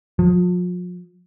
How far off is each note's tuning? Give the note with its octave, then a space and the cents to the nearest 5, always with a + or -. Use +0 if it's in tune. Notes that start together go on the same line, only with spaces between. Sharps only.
F3 +40